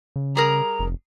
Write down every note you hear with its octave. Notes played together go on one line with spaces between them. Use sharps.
C#3
G3 G#4 A#4 A#5
F1